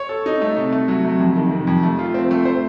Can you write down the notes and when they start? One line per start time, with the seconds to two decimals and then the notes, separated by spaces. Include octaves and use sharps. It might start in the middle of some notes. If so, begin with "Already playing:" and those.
Already playing: C#5
0.09 A4
0.26 D#4
0.42 A3
0.56 C3
0.72 A3
0.88 F#3
1.04 C3
1.19 F2
1.36 D#3
1.51 C3
1.67 F2
1.83 A3
1.99 F4
2.14 C4
2.31 A3
2.45 C5